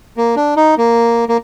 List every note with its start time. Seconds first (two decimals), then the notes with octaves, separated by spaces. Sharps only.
0.17 A#3
0.36 D4
0.57 D#4
0.78 A#3
1.29 A#3